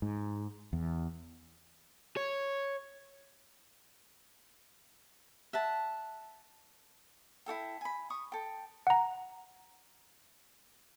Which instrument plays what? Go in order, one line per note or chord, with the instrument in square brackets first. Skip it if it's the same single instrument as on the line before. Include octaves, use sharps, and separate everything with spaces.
[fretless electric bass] G#2
E2
[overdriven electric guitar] C#5
[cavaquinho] E5 F#5 A5
E4 F#4 A4 G5
G#5 B5
C#6 D#6
A4 G5
[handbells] F#5 A#5